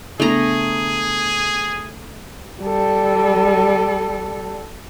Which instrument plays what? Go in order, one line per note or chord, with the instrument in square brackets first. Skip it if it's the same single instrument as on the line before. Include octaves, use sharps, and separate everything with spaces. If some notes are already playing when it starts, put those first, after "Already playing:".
[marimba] C#3 B3 D4 [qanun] A3 A#5 [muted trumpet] G#4
[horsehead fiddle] G3 A4